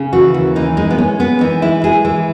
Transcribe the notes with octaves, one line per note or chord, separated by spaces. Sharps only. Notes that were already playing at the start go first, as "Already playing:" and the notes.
Already playing: C#3
E3 F#4
D#2
E3 D#4
G#3 D#4
B3
G#3 C#4
G#3 B3
E3 D#4
G#3 E4
G#3 G#4
E3 E4